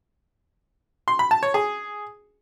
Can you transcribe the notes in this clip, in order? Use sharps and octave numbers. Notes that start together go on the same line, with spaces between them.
C6
B5
A5
C#5
G#4